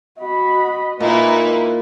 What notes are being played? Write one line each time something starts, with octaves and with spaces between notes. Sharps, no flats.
F#4 D#5 B5
A#2 A#3 D#4 E4 B4